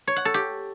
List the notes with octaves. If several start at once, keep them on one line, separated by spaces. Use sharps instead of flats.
C#5
F#5
A4
G4